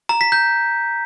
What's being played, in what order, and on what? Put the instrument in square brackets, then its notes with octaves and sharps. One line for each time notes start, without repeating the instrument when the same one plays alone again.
[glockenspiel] A#5
B6
G6